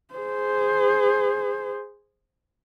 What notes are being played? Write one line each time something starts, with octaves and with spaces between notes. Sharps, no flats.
G#4 C5